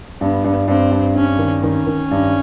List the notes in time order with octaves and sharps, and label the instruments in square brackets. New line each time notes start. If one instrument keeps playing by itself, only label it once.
[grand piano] G2 [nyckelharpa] B3
[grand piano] G2
[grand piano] G2 [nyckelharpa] C4
[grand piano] G2
[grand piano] G2 [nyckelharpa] C#4
[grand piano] D#3
[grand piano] D#3 [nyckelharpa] C#4
[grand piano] D#3
G2